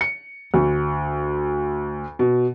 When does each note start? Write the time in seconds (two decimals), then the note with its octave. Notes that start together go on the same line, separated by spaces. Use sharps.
0.01 C#7
0.54 D2
2.19 B2